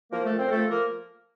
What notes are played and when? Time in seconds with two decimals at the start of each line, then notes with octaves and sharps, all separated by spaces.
0.12 F3 A#3 A#4
0.25 A3 A4
0.31 A#2
0.38 C4 C5
0.46 A#4
0.51 F3 A3 A4
0.70 F3 A#3 A#4